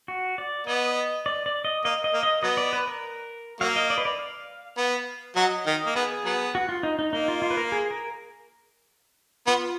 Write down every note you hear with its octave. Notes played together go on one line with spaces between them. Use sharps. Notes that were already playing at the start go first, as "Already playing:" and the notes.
F#4
D5
B3 D#5
D5
D5
D#5
A#3 D#5
D#5
A#3
D#5
F#3 B3 D#5
D5
B4
A#4
F#3 A#3 F5
D#5
D5
B4
D5
F5
B3
F#3 F#4 D#5
D#3 D#4
A#3
B3 G#4
F#3 B3
F#4
F4
D#4
D#4
A#3 D#4
F4
F4
B4
A#4
G#4
A#4
B3 F4